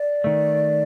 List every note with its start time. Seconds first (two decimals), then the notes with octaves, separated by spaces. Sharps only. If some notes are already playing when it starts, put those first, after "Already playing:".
Already playing: D5
0.24 D#3 A3